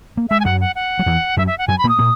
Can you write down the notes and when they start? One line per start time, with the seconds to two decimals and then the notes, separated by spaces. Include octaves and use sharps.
0.17 A#3
0.29 G#3 E5
0.40 G#5
0.45 F#2 F#3 F#5
0.61 F#5
0.75 F#5
0.99 F#3
1.06 E2 E3
1.37 F#2 F#3 E5
1.47 E5
1.58 F#5
1.68 F#2 F#3 G#5
1.78 B5
1.84 A#2 A#3
1.89 D#6
1.99 A#2 A#3